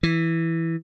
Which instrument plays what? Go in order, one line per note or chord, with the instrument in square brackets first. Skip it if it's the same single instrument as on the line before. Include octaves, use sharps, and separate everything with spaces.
[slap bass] E3